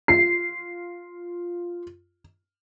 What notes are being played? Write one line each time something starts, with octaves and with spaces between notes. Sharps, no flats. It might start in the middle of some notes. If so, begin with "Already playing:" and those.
F4 C7